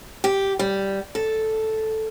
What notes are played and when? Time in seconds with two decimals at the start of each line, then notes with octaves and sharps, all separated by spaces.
0.24 G4
0.59 G3
1.15 A4